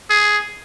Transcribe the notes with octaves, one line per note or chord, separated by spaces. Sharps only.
G#4